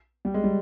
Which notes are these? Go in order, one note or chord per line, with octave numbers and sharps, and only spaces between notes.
G3
G#3
G3